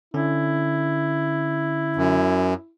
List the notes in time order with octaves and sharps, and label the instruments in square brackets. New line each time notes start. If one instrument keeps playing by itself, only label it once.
[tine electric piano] D3 C#4 [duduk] E4
[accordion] F#2